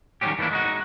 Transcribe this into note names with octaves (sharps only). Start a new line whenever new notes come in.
D#3 F#3 G3 C4 C#4 G4
E3 A3 A#3 D4 E4
G#3 D#4 F#4